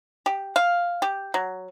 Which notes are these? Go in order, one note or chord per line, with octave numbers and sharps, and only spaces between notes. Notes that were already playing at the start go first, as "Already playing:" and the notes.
G4
F5
G4
F#3